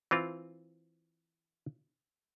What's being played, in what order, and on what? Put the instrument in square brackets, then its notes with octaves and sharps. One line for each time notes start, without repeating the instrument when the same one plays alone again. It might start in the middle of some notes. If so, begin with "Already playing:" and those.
[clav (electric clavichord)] E3 C4 F4